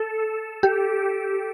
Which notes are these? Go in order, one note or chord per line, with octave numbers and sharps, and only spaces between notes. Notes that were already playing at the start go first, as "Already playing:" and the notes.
Already playing: A4
G4